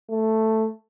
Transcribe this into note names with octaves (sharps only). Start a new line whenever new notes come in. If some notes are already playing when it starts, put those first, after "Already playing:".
A3